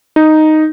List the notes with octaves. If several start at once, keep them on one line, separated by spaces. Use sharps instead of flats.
D#4